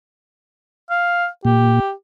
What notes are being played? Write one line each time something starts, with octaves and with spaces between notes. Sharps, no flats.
F5
A#2 G4